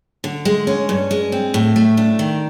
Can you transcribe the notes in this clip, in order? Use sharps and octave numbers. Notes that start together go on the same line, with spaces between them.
D3
G#3
C#4
G2
G#3
C4
A2
A3
D4
D#3